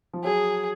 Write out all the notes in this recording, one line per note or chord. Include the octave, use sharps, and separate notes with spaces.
F3
F#3 G#4